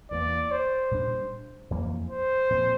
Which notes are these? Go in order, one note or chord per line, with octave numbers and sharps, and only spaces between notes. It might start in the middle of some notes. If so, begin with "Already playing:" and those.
E2 E3 A#3 D5
C5
A#2 G3 D4
F2 E3 A#3
C5
A#2 F3 C4